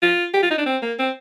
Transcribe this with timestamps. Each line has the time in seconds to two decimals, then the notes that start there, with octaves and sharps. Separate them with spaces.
0.02 F4
0.34 G4
0.43 F4
0.51 D#4
0.58 D4
0.66 C4
0.82 A#3
0.99 C4